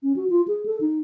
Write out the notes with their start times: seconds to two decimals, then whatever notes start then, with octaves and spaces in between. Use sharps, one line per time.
0.03 C#4
0.16 F#4
0.30 F4
0.48 G#4
0.66 A4
0.81 D#4